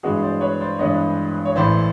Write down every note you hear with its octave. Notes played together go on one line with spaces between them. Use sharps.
G2 E3 G#3 B3 D4 F#4 G#4
C5 D5
B4 C#5
C5 D5
G2 E3 G#3 B3 D4 C#5 D#5
C#5
A1 A2 E3 C5 D5